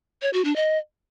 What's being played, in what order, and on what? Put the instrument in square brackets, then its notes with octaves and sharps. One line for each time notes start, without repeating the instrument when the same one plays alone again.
[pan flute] C#5
F#4
D4
D#5